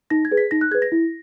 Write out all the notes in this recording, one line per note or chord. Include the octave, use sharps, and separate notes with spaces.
D#4 A#6
G#6
G#4 B4
B6
D#4 A#6
F#6
G#4 B4 G#6
A#6
E4